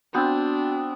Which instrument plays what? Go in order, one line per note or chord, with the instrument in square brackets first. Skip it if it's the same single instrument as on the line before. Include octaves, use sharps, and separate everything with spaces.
[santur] B3 C4 [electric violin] D4 [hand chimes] F#4 E6